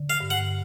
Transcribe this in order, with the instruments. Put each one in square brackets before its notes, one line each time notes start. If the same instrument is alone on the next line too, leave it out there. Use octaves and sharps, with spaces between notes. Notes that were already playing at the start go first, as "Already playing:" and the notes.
Already playing: [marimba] D3
[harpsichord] F5
[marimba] G2
[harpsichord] F#5